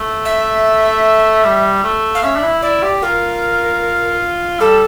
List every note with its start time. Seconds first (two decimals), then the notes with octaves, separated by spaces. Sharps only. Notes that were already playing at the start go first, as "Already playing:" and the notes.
Already playing: A3
0.25 E5
1.44 G3
1.83 A3
2.15 F5
2.23 C#4 E5
2.36 D4
2.43 E4
2.62 E4 D5
2.82 G4
3.02 F4 A#4
4.60 G3 A4